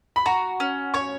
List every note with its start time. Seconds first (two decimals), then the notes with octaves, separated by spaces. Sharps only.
0.16 B5
0.26 F#4 A#5
0.60 C#4
0.94 C#5 C#6